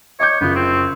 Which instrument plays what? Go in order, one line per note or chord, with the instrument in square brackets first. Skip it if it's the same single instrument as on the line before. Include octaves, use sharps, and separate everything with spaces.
[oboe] C#5 [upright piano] D#5 D6 G6
[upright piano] F#1 F4 [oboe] B3
[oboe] C4